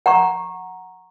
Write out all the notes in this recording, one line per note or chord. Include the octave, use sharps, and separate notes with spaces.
F#5 A#5 C#6